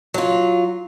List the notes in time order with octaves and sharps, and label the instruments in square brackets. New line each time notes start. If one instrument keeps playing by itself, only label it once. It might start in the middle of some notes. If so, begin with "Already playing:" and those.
[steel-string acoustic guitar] F#3 F4